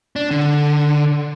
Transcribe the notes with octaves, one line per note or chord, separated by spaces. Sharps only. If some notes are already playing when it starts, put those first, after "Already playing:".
D4
D3